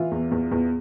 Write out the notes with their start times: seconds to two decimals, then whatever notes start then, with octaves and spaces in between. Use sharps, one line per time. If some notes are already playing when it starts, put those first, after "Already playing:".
Already playing: E3 F4
0.11 E2
0.31 E2
0.51 E2